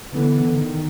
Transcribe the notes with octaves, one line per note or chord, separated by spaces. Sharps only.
D3 E3 B3
D#3